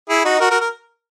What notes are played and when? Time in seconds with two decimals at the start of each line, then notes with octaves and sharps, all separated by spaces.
0.09 E4 G#4
0.25 D#4 F#4
0.40 F#4 A#4
0.51 F#4 A#4
0.61 A#4